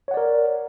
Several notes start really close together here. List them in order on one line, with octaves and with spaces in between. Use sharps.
C#5 F#5 D5 A#4